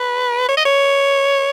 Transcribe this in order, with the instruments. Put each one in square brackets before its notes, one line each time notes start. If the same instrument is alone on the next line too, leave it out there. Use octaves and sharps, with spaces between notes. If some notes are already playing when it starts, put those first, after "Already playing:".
Already playing: [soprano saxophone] B4
C#5
D#5
C#5